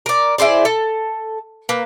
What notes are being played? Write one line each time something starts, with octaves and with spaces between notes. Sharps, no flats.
A#4 D5
E4 G#4 C5 D5
A4
A#3 B4